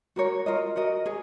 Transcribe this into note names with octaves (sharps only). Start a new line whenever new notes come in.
F#4 A#4 C#5
F4 A#4 D#5
F#4 A#4 D#5
G#4 C#5